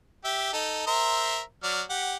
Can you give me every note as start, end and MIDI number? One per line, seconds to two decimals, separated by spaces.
0.24 0.51 67
0.24 0.51 76
0.24 0.51 79
0.53 0.84 63
0.53 0.84 69
0.87 1.40 70
0.87 1.40 72
0.87 1.40 76
1.63 1.82 54
1.63 1.82 74
1.63 1.82 89
1.90 2.16 67
1.90 2.16 78